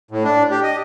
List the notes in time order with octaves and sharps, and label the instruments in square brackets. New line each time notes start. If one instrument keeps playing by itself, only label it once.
[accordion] A2
D4
G4
D#5